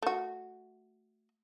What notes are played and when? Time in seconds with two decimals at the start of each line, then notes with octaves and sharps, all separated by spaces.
0.02 A3 F#4